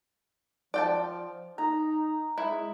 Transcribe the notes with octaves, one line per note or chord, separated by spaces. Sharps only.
F3 D5 G5 A5
D#4 A#5
G#3 E4